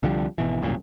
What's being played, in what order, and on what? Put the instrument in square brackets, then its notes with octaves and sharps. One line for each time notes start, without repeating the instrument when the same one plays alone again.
[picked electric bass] C2 D3 F3 G3
G#1 B2 E3
E1 C2 F#2 A#2